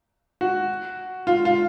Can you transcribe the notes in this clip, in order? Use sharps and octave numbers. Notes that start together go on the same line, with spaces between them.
F#4
F4
F4